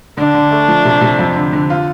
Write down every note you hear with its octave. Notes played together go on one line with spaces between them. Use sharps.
D3 D4
D3
A3
F3
C3
C3
F2
D3
D3
F4